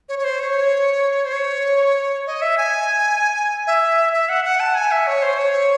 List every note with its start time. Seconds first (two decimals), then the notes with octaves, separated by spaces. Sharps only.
0.09 C#5
0.19 C#5
0.24 C5
0.40 C#5
1.25 C5
1.34 C#5
2.27 D#5
2.42 E5
2.58 G#5
3.67 E5
4.13 E5
4.29 F#5
4.45 F#5
4.60 A5
4.75 G#5
4.91 E5
5.07 C#5
5.22 C5
5.38 C#5